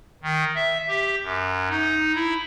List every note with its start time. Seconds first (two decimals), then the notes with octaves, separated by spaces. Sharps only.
0.23 D#3
0.56 E5
0.88 G4
1.23 F#2
1.69 D#4
2.15 E4